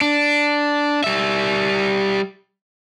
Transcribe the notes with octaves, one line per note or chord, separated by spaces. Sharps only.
D4
G3 E5